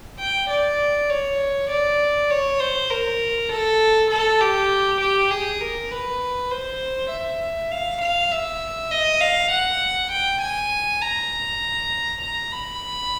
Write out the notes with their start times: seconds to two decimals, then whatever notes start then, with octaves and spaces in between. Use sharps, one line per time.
0.19 G5
0.50 D5
1.10 C#5
1.70 D5
2.31 C#5
2.60 C5
2.90 A#4
3.50 A4
4.10 A4
4.40 G4
5.00 G4
5.31 G#4
5.61 A#4
5.91 B4
6.51 C5
7.10 E5
7.71 F5
8.01 F5
8.31 E5
8.91 D#5
9.21 F5
9.51 F#5
10.11 G5
10.41 G#5
11.01 A#5
12.21 A#5
12.51 B5